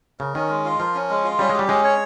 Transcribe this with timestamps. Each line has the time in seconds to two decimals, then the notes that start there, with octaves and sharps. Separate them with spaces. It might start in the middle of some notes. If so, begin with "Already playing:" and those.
0.19 C#3 A#4
0.35 D#3 C#4
0.49 G#3
0.65 F4
0.79 F3 A#4
0.95 C#4
1.10 G#3
1.24 F4
1.39 G3 C#4
1.50 G#3
1.54 G4
1.59 G3
1.69 G#3 C#4
1.84 C#5